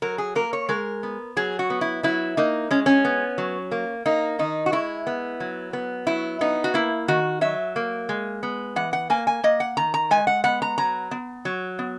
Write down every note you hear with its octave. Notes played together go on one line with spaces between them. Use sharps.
F#3 A#4
G#4
A#3 A#4
C#5
G#3 A#4
B3
F#3 G#4
F#4
B3
E4
F#3 E4
A#3 D#4
G#3 C#4
C#4
B3
F#3
A#3
A#3 D#4
D#3 D#4
F#4
G#3 E4
B3
F#3
B3
F#3 E4
B3 D#4
F#4
A#3 E4
D#3 F#4
F#3 E5
A#3
G#3
B3
E3 F#5
F#5
A#3 G#5
G#5
A#3 D#5
F#5
D#3 A#5
A#5
G#3 G#5
F#5
B3 F#5
A#5
F#3 A#5
B3
F#3
B3